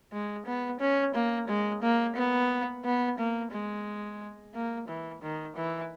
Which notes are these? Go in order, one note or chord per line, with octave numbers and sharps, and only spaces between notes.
G#3
B3
C#4
A#3
G#3
A#3
B3
B3
A#3
G#3
A#3
E3
D#3
E3